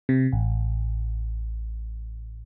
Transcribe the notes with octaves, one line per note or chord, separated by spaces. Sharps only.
C3
A1